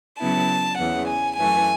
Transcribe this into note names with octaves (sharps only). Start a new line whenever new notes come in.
C#3 F#3 B3 E4 A5
E2 C#3 E3 F#5
G#5
F#2 E3 A3 G#5